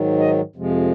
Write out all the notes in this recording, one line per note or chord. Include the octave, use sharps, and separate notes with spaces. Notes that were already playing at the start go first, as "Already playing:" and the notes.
Already playing: G#2 D#3 F#3
D#5
F2 C3 F3 G#3